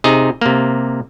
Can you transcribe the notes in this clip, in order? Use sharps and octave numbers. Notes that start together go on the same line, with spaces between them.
C3 D#4 G#4
C3 A#3